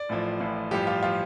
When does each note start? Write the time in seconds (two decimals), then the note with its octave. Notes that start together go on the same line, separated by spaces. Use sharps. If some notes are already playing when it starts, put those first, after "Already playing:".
Already playing: D5
0.09 A1 A2 F3
0.40 A1 A2 F3
0.71 A1 G2 F3 G4
0.87 F4
1.03 F3 F4